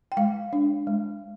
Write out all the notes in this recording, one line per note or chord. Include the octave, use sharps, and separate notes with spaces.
G5
G#3 F5
D4
G#3